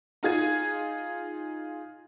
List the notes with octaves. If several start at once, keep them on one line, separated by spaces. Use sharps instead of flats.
D#4 F4 G#4 G#6 D#7